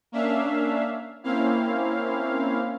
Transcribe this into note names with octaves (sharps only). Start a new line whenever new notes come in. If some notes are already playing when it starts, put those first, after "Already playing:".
A#3 C#4 D4 E5 F5
A#3 C4 C#4 E4 F5